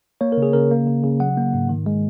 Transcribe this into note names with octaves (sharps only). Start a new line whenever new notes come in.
A#3 C#5
A#4
C#3
G#4
C#3 A#4
A#3
C#3
C#3
F#3 F#5
A#3
G#2
D#3
G#3